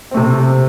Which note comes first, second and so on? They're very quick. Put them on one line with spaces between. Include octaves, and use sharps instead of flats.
C4 A3 C3